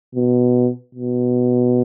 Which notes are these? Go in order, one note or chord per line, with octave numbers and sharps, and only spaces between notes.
B2
B2